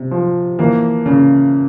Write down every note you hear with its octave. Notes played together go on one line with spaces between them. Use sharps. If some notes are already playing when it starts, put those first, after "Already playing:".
Already playing: C3
F3
E3 A#3
C#3